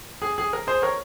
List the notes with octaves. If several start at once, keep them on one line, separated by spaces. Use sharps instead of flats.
G#4
G#4
A#4
G#4 C5
A#4 C#5